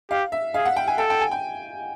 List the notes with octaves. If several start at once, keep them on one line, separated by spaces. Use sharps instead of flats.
G4 F5
E5
G#4 F5
F#5
G5
G#5
A4 G5
G5
G#5
G5